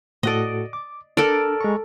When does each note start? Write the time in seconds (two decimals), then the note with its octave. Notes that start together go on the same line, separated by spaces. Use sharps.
0.23 A2 F#4 A4 D5 D#5
0.73 D6
1.17 D4 A4 A#4 D5
1.61 G#3 A#5 C#6